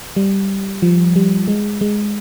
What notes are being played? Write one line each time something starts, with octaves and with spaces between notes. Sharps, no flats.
G3
F3
G3
G#3
G#3